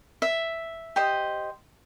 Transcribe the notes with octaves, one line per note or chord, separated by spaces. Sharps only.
E5
G4 C5 D#5